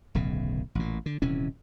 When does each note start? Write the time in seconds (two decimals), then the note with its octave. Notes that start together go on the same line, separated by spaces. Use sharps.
0.15 D1 B1 C#3
0.75 A1 A#2
1.06 D3
1.22 D#1 C3 E3 C#4